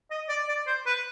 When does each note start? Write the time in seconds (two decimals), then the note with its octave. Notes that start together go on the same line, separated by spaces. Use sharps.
0.11 D#5
0.29 D5
0.49 D5
0.67 C5
0.86 B4